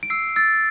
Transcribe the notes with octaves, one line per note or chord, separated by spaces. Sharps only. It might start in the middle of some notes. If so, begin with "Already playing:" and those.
D7
E6 C7
E6 A6